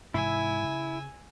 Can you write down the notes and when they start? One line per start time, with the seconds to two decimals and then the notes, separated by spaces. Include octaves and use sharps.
0.14 G#2 C3 E3 E4 G#5 E6
0.64 C#3